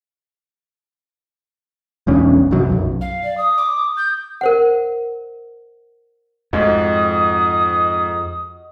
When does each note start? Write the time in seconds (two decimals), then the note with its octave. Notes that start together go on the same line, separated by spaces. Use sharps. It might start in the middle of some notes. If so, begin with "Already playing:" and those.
2.07 E1 B1 C#4 D4
2.51 C2 G2 F#3
2.70 B1 F#2
3.01 F5
3.23 D5
3.37 D#6
3.58 D6
3.97 G6
4.41 A#4 C5 F#5
6.53 F2 G#2 F#4 D#5 D#6